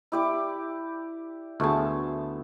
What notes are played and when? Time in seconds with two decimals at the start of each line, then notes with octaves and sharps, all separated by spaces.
0.12 E4 G4 D5
1.60 D2 A3 B3 G#4 A5